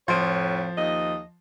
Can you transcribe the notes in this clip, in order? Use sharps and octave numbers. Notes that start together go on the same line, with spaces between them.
F2 A2 F3 C#5 C6
D#2 D#5